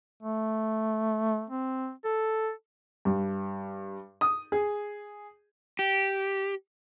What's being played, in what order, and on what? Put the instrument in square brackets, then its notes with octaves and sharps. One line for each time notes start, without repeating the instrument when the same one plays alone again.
[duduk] A3
C4
A4
[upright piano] G2
D#6
G#4
[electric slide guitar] G4